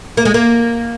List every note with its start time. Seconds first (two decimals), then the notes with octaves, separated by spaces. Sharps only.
0.17 A#3
0.25 G#3
0.34 A#3